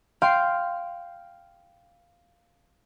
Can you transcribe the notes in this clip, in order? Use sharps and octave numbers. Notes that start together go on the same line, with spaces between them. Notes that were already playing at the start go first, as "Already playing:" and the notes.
F5 G5 C6